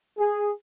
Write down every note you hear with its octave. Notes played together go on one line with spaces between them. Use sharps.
G#4